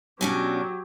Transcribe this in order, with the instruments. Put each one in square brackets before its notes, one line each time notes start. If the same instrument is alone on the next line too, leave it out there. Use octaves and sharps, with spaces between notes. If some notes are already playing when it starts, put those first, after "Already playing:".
[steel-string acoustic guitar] B2 C#4 D4 [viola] F#3 G4